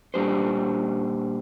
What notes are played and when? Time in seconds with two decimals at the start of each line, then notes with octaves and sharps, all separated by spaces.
0.14 A#2 G3 D4 G4 C5